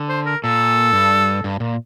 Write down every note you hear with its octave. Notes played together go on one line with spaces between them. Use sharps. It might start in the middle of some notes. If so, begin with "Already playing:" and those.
Already playing: D3
C5
A#4
A#2 A4
G2
G2
A#2